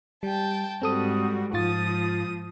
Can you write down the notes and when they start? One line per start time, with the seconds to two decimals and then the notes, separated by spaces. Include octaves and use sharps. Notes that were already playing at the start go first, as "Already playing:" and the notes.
0.23 G3 G5 A5
0.82 G#2 G3 C4 F#4 A4 D#6
1.53 G#2 F3 F4 D#6 A6